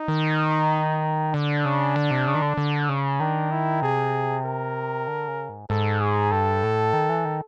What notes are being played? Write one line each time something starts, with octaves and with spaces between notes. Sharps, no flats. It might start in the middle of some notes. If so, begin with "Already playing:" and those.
Already playing: D#4
D#3
D3 D4
C#3
D3
C3
C#3
D#3
D3
D3
C#3
D#3 D4
E4
C3 G#4
A#4
D3
C#3
G#2
G#2 A4
G#4
G2 A4
A2
D#3
E3
D#3